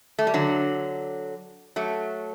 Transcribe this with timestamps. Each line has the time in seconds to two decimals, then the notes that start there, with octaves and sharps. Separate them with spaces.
0.19 A3
0.27 G3
0.34 D3 F#3
1.76 F#3 A3